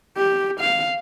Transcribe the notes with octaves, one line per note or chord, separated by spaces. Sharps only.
G4
F5